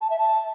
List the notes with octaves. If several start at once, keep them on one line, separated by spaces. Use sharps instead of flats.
A5
E5
A5